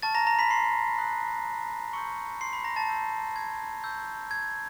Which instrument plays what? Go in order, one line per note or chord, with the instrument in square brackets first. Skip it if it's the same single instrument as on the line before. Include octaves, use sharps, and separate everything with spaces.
[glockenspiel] A5 C#6 F6 A6
A#5 A#6
A#5 A#6
B5 B6
C6 C7
C6 D#6 F#6
C6 C#6 E6 G6 C#7
C6 C7
B5 B6
A#5 A#6
A5 A6
C6 E6 G6
G#6
C#6 E6 G6
G#6